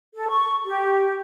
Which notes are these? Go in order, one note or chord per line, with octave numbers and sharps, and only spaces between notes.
A4
C#6
G4